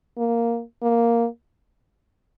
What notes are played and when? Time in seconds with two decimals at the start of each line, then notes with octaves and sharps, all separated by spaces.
0.18 A#3
0.82 A#3